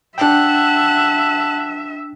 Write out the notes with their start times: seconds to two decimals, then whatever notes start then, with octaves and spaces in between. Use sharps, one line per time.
0.18 D4 E5 F#5 G5 A5